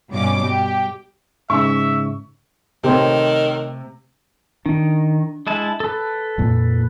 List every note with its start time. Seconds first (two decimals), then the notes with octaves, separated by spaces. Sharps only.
0.10 G2 B2 C#4 D6
0.44 G4
1.50 G#2 C#3 E5 C#6
2.84 C3 D#3 A3 C4 G4 C5 C#5
4.66 D#3 D4
5.47 G#3 E4 A5
5.80 A4 B4
6.38 F2 A#2